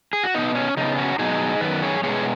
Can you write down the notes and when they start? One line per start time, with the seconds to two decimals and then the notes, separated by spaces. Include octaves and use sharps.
0.13 G#4
0.24 F#4
0.34 B2 B3 D#4
0.55 C#4
0.77 C#3 B3 D#4
0.97 C#4 F#4
1.19 B2 F#3 B3 D#4 G#4
1.61 F#2 D#3 B3 B4
1.83 G#4 C#5
2.03 B2 G#3 B3 G#4 C#5